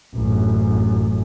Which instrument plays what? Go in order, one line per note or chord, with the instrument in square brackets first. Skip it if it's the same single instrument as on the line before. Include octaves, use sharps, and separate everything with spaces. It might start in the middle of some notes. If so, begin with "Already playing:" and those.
[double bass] A1 F#2